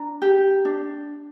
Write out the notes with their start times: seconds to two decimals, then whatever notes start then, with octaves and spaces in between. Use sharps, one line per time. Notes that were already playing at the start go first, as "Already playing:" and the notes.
Already playing: D4 A#5
0.22 G4
0.65 D4